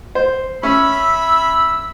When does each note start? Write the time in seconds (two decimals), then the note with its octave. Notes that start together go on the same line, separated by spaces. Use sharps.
0.15 C5
0.63 C#4 E5 B5 E6